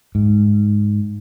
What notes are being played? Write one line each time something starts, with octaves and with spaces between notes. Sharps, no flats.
G#2